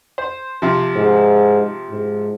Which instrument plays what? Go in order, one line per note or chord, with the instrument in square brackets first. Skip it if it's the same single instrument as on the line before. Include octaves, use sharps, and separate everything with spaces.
[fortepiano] C5
C3 F3
[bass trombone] G#2
G#2